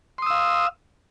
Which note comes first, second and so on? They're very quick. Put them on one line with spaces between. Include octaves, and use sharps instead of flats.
C6 D#6 E6 F5